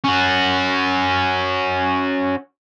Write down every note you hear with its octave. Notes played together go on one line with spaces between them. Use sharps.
C#4 F#4